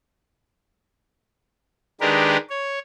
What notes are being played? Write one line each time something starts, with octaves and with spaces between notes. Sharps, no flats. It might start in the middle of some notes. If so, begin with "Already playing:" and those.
D#3 G#3 D4 G4 A#4 B4
C#5